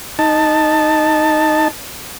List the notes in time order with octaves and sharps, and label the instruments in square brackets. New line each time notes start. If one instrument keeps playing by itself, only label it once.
[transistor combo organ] D#4 A5